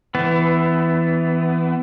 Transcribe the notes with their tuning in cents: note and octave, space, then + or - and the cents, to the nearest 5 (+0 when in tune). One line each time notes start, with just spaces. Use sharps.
E3 +0 B3 +25